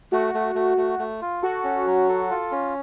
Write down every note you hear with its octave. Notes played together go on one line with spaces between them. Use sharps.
A3 F#4
A3
A3
A3
A3
F4
F#4 A4
C#4
F#3
A4
F4
C#4